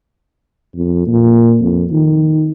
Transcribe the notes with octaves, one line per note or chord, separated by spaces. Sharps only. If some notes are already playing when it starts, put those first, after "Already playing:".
F2
A#2
F2
D#3